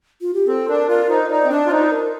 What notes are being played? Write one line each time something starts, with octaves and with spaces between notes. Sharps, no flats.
F4
G4
C4 A4
D4 A#4
F4 A#4
D#4 C5
D#4 D5
C4
D4 D5
F4
D#4 C5
A#4